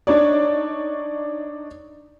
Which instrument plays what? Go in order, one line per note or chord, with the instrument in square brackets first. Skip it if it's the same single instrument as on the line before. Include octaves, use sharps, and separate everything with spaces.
[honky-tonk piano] D4 D#4 C#5 D5